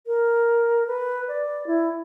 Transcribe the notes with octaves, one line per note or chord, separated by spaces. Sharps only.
A#4
B4
D5
E4